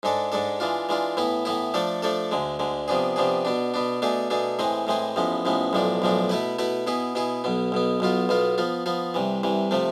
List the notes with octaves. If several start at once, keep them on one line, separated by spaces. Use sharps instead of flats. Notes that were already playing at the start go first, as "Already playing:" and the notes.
G#2 G#3 D4 A4
G#2 G#3 D4 A4
E3 G#3 D4 F4
E3 G#3 D4 F4
A2 E3 B3 E4
A2 E3 B3 E4
F3 A3 D4 A4
F3 A3 D4 A4
D2 D3 G#3
D2 D3 G#3
C3 F3 B3 D4 G#4
C3 F3 B3 D4 G#4
B2 B3 D4
B2 B3 D4
B2 A3 D4 G#4
B2 A3 D4 G#4
A2 E3 G#3 C4 G#4
A2 E3 G#3 C4 G#4
A1 A2 F3 G#3 B3
A1 A2 F3 G#3 B3
B1 A2 F3 G#3 D4
B1 A2 F3 G#3 D4
B2 A3 E4 B4
B2 A3 E4 B4
B2 B3 E4 G#4
B2 B3 E4 G#4
B1 B2 B3
B1 B2 B3
B1 B2 B3 F4
B1 B2 B3 F4
F3 B3 F4
F3 B3 F4
C2 C3 E3
C2 C3 E3
C3 F3 A3